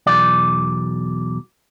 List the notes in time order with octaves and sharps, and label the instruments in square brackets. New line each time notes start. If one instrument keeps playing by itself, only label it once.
[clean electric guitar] B1 E2 D5